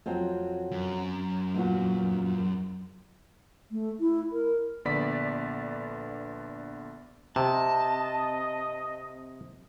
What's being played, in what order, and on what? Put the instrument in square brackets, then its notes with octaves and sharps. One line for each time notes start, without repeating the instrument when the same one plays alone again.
[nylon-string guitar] F2 F#3 C4
[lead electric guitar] F#2
[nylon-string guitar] E2 A#2 F#4
[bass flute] A3
E4
A#4
[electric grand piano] A#1 D3 B3 D5 B5 B6
[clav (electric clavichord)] C3 [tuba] C4 [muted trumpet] D#5 [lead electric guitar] A5